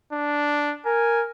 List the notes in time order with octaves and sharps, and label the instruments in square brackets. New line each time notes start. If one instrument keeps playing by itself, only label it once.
[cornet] D4
[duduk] A#4 [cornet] G#5